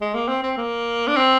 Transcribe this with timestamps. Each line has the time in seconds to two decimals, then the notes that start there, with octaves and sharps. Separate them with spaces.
0.01 G#3
0.14 A#3
0.28 C4
0.43 C4
0.57 A#3
1.07 D4
1.16 C4